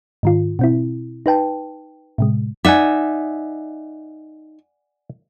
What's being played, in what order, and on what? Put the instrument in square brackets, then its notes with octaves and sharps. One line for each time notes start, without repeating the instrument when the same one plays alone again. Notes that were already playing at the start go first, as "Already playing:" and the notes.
[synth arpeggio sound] G#2 D#3 F4
B2 C4 E4
D#4 B4 G5 A5
A2 C3 G#3
[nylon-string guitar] D#4 E5 [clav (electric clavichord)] D5 F#5 G#5